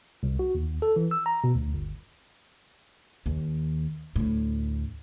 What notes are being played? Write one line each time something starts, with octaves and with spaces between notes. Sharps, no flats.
C2
F#4
D#2
A4
E3
E6
A#5
B2
D2
G1
D#2
D2 A2